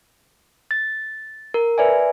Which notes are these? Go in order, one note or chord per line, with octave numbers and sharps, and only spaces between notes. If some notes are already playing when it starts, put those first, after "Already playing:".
A6
A#4
B4 D5 E5 G#5